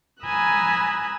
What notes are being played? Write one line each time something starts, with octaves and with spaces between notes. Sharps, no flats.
G#5 A#5 B5 D#6 E6 F#6